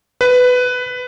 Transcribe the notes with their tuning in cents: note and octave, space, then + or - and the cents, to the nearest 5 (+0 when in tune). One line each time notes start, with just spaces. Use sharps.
B4 +10